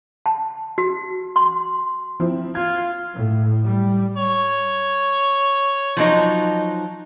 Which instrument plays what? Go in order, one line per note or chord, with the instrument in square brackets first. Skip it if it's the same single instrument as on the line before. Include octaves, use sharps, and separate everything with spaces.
[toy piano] A5
F#4
C6
[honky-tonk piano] F3 C4 E4
[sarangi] F4 [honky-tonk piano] G#6
[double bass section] A2
G3
[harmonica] C#5
[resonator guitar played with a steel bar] F3 F#3 D#4